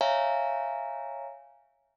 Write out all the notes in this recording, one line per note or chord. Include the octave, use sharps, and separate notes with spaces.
C#5 E5 F5 G#5 A#5